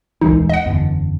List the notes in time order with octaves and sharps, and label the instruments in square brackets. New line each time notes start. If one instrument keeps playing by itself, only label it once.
[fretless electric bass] D#1 E3 G#3 [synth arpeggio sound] C2 D#4
[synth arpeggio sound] D#5 F#5
[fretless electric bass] F#1 E2 D3